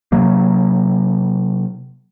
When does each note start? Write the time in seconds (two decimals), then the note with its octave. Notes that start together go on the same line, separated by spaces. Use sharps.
0.12 C3 F#3 A#3